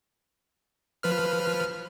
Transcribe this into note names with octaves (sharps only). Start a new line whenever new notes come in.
F3 B4 F6